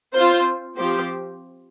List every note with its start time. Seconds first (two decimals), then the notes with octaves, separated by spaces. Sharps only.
0.14 C4 F4 C5
0.77 F3 C4 G4 C5